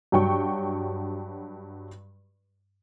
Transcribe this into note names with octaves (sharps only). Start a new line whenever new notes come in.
G2 F#3 G5 C#6